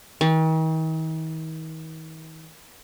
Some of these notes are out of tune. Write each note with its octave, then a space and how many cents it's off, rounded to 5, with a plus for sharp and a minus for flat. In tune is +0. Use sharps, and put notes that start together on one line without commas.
D#3 +45